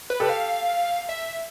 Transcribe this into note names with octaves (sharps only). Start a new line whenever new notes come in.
B4
G4 A4
F5
E5